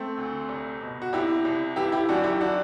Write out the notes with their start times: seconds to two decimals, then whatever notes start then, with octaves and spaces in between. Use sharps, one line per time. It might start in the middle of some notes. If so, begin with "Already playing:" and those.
Already playing: A3 C4
0.17 D2
0.49 C2
0.81 B2
1.02 F#4
1.13 C2 E4 G4
1.45 C2
1.76 E3 E4 G4
1.92 E4 G4
2.09 F#2 D4 F#4
2.24 E4 G4
2.40 D4 F#4